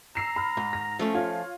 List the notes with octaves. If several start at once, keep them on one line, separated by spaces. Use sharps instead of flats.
A#5 E6 C7 E7
B5 F6
G#2
A#6
F3 A3 C#4 A4
F4 C#5